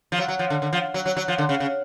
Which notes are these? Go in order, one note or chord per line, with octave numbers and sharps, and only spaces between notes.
F3
F#3
F#3
F3
D3
D3
F3
F#3
F#3
F#3
F3
D3
C#3
C#3